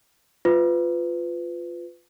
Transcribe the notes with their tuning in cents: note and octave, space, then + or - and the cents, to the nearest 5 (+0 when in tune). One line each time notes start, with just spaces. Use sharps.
F4 +0 B4 +25